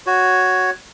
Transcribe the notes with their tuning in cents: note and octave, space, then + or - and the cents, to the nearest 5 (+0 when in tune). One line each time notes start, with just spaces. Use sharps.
F#4 +0 C#5 +0